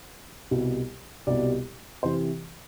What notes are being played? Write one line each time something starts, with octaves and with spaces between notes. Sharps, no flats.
C2 B2 G3
C2 B2 G3 D5
C3 E3 C5